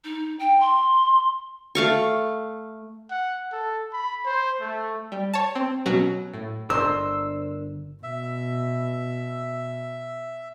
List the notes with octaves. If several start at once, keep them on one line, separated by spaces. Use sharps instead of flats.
D#4
G5
C6
A3 F5 C#6
F#5
A4
B5
C5
A3
G3
C#5 A5
C4
B2 F#3 C#4 F#4
A2
G1 D3 D4 A#4 C5 D#5 E6
B2 E5